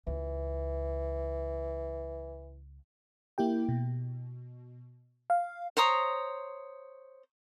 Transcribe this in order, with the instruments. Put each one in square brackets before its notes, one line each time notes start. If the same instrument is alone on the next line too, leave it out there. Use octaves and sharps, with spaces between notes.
[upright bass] C#2 [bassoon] E3
[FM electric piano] A#3 E4 G4 G5
B2
F5
[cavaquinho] C5 C#5 A#5 D#6